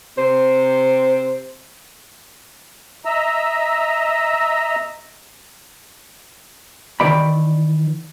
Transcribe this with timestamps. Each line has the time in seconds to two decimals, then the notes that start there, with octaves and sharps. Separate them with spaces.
0.17 C3 C5
3.05 D#5 E5 A#5 E6
7.00 D#3 E3 D5 B5